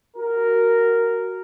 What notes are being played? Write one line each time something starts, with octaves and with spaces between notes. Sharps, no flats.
F#4 A#4